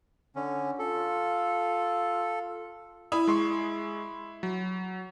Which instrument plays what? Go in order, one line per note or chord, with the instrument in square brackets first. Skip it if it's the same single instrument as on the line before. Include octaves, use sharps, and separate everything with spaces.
[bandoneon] D3 C#4
[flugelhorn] F4 [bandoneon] A4
[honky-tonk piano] E4 [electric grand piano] D#6
[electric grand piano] G#3 C6 C#6
F#3